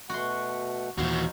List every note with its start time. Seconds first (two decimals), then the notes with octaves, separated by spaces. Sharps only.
0.10 B2 A3 F#4 F#5 C6
0.98 D#2 A#2 E3 D#4 F#4 C5 F5